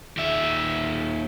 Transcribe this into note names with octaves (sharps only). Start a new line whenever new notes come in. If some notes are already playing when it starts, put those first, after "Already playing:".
D#2 E5